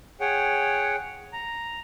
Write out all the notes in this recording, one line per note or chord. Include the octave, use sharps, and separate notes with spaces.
G#4 C#5 F#5 G5
A#5